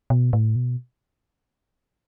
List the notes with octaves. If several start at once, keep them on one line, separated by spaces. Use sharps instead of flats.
B2
A2
B2